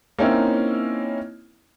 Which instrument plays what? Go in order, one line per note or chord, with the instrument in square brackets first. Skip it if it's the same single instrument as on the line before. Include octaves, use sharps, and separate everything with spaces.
[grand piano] A#3 C4 C#4 D#4 E4 C#5